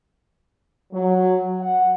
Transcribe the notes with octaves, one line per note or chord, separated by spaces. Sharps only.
F#3
F#5